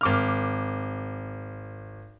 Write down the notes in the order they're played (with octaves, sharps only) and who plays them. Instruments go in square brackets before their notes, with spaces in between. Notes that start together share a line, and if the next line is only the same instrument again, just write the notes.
[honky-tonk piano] G#1 D6 F6